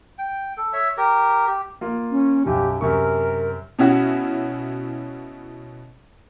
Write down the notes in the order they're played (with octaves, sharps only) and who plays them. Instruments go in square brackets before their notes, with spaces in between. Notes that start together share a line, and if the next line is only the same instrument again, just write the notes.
[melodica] G5
A4
C#5 E5
G4 A#4
G4
[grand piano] A#3 F4
[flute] C#4
[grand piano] B1 F#2 [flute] G4
[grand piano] F#2 C3 C#6 [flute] A#4
[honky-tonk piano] B2 C#4 E4 F#4